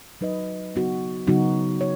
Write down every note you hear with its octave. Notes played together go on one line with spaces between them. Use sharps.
F#3 D#4 B4 D#5
C#3 F#3 B3 D#4 F#4
C#3 F#3 B3 D#4 F#4
C#5